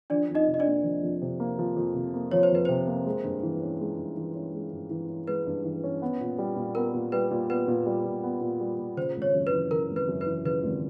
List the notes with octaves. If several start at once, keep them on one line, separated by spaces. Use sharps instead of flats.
F3 D4 D5
F2
D#4 D#5
C3
D#5
D4 D5
A#3
F3
F2
C3
A#3
F3
F2
C3
A#3
F3 C#5
C5
F2 B4
C3 C5
A#3
G#3
G2
E3
C#4
G#3
G2
E3
C#4
G#3
G2
E3
C#4
G#3 B4
G2
E3
C#4
B3
A#2
G3
A#2
B3 A#4
A#2
G3 B4
A#2
B3 B4
A#2
G3
A#2
B3
A#2
G3
A#2
C#3 C5
G#1
C#5
F#2
B4
E3
C#3 A#4
G#1
B4
F#2
B4
E3
C#3 B4
G#1